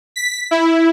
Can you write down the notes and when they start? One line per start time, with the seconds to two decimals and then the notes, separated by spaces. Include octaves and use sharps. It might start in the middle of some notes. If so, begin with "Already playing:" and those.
0.16 B6
0.51 E4